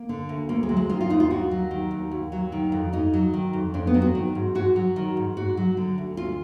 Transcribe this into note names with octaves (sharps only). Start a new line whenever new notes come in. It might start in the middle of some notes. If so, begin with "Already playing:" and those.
Already playing: A#3
D3
D2
D2 A#3
G#3
F#3
G#3
D#3 F4
F4
D#2 D#4
F4
D#2 F#4
F#3
D#3
D#2
D#2
F#3
D#3
F2
F2 D#4
F#3
D#3
F2
F2 D4
B3
F#3
F#4
D#3
G#2
G#2 F#4
F#3
D#3
G#2
G#2 F#4
F#3
D3
D2
D2 F4